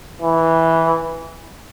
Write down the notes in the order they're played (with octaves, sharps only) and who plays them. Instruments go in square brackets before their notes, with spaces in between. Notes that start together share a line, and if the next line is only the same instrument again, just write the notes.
[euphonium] E3